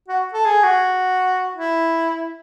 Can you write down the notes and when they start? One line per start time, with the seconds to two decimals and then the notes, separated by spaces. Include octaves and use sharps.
0.08 F#4
0.33 A4
0.46 G#4
0.64 F#4
1.55 E4